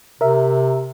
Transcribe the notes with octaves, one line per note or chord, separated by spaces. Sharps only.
C3 A#4 E5